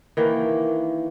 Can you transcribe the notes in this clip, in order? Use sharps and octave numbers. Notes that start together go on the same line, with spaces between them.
D#3 E3 A#3